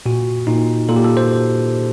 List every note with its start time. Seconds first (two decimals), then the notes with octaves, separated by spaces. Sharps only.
0.06 A#2 F#4
0.47 A#2 D#4
0.89 A#2 A4
0.96 G4
1.04 A4
1.17 C5